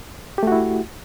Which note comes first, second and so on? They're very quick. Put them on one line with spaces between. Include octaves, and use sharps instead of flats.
G4 A3 F#4 E4